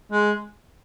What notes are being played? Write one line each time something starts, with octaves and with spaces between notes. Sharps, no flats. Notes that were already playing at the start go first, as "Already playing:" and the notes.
G#3